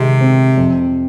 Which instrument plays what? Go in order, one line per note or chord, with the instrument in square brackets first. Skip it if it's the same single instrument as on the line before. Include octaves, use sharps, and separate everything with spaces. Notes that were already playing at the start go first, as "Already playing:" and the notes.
Already playing: [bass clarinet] C3 [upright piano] D#3 G#3
[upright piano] C4
F2